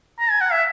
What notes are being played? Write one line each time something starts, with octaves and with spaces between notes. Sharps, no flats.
A#5
G#5
F#5
E5